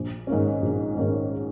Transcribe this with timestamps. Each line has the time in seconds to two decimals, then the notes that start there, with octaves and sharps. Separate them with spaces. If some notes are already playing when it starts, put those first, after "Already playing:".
Already playing: A#1
0.27 G#2 D#3 A#3 C#4
0.62 A#1
0.96 G#2 D#3 A#3 C#4